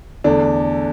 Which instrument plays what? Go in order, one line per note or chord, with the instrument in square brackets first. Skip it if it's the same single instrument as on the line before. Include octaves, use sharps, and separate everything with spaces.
[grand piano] E2 D3 A3 D4